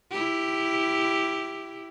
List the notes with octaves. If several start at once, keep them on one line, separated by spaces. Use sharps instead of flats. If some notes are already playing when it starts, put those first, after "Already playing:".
E4 G4